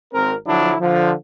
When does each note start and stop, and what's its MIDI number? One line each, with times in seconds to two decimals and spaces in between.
0.14 0.34 32
0.14 0.34 60
0.14 0.34 70
0.47 0.75 50
0.47 0.75 53
0.47 0.75 54
0.47 0.75 62
0.47 0.75 64
0.80 1.12 50
0.80 1.12 53